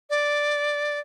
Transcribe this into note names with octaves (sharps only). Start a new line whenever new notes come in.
D5